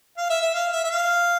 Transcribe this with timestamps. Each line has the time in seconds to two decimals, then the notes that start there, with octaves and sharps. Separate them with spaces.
0.18 F5
0.30 E5
0.42 E5
0.54 F5
0.73 E5
0.84 E5
0.91 F5